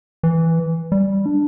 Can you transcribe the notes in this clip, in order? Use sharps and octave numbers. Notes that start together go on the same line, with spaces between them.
E3
G3
D4